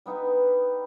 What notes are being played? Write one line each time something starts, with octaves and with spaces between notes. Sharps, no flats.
G3 B3 D#4 B4